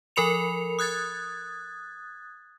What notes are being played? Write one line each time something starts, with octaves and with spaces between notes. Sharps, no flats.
F3 A4 A#4 B5 C#7 F7
D#6 F#6 G#6 A6